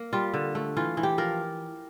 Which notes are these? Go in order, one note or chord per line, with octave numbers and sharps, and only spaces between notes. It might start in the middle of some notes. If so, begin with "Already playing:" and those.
Already playing: A#3
G3 F4
D3
A3
E3 F4
E3
G4
F3 A#4